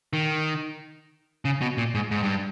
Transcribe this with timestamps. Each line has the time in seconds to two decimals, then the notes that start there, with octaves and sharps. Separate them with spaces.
0.13 D#3
1.45 C#3
1.61 B2
1.78 A#2
1.95 G#2
2.11 G#2
2.23 G2